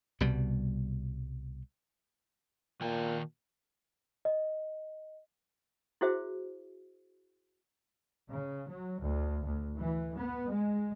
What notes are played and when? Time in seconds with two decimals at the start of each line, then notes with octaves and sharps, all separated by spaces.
0.20 C2 B2 G3
2.81 A#2 D#3 G5 A5
4.25 D#5
6.01 E4 F#4 G#4 C5 E5
8.28 C#3
8.67 F#3
9.02 D2
9.45 D2
9.76 E3
10.16 B3
10.51 G#3